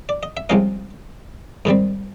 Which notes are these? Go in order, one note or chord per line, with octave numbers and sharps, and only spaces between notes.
D5
D#5
E5
C2 C3 F3 G#3 C#4 D#5 F5
G#2 D#3 G3 C4